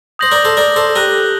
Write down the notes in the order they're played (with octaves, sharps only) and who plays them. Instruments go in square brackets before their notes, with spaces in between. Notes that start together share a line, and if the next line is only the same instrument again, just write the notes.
[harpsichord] C5 [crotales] D#6 G6 A#6 F#7
[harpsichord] A#4 D5
A4 C5
A#4 D5
A4 C5
[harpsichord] G4 A#4 [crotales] F#6 A#6 D#7 G7